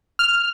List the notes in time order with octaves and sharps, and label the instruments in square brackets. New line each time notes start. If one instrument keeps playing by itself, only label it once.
[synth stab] F6